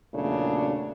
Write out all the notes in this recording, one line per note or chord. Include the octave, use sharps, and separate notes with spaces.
E2 A#2 C#3 F#3 A3 D4